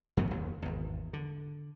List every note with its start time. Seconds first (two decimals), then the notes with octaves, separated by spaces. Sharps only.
0.17 F2 G#2 C3 B3
0.31 F#1 D#2
0.62 G#1 E2
1.13 D3